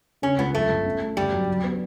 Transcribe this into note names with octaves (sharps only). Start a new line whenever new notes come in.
C#3 C#4
C#2 B3
F#2 A3
G1
C#4
A3
G1 G3
F#3
F#2
B3